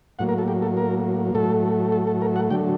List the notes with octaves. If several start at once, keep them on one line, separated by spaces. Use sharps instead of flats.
A2 F#3 A#3 F#5
A#4
A4
G4
A4
A#4
A2 F#3 A3 A4
A4
A4
A#4
F#5
D3 F#3 A3 G5